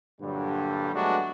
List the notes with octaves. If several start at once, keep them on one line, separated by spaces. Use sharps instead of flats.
G2 A#2 D3 F#3 G3
F#3 G#3 A3 B3 D4 F#4